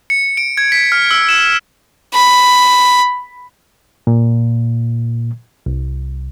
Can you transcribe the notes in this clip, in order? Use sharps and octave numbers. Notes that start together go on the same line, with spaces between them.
C#7
D7
G#6
B6
F6
E6
E7
B5
A#2
C2